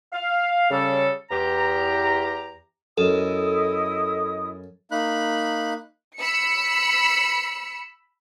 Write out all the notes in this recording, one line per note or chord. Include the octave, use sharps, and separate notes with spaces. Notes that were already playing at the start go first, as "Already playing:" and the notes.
F5
C#3 G3 A4
E2 G4 A#5
F#2 E4 A4 D#5 D#6
A#3 D#4 B5 F#6
B5 E6 C#7